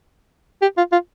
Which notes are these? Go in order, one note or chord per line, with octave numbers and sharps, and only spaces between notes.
G4
F4
F4